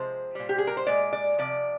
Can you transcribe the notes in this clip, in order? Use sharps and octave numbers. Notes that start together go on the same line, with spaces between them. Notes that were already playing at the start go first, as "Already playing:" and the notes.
Already playing: C3 F3 G#3 C5
A#2 G3
G4
G#4
A#4
C5
A#2 G#3 D5
D5
C3 F3 D5